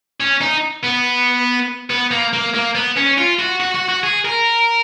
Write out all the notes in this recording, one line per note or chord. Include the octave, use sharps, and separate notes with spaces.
C#4
D#4
B3
B3
A#3
A#3
A#3
B3
C#4
F4
F#4
F#4
F#4
F#4
G#4
A#4